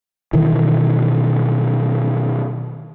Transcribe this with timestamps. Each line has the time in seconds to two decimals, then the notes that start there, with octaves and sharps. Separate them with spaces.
0.33 B2 D#3 E3